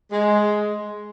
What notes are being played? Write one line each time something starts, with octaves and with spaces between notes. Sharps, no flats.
G#3